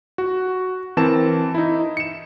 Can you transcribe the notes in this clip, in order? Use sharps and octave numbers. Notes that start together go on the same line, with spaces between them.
F#4
E3 C4 A#4 A5 E7
D#4 E4
C#7 E7